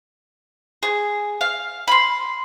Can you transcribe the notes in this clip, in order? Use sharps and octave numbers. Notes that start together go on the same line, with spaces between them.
G#4
F5
B5 C6